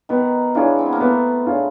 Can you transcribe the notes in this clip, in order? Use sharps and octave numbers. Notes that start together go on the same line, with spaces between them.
D#3 B3
E3 D4 F4 G#4 C#5
C4
B3
A#3
A3 B3
D4 F4 G#4 C#5